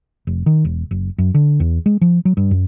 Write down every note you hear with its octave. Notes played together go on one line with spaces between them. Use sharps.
F1
D#3
E1
F#1
F#2
D3
E2
G#3
F3
F#3
G2
F#2